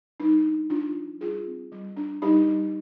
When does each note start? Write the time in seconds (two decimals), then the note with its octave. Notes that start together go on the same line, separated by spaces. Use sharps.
0.20 G3 D#4
0.45 D4
0.70 F3 D4 F4
0.96 F3
1.20 G3 F4 G#4
1.46 C4
1.72 G3
1.97 D4
2.22 G3 D#4 G4
2.48 G3